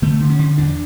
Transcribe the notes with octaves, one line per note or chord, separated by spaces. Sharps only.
D3 A3
D3
C#4
D3
E2 D4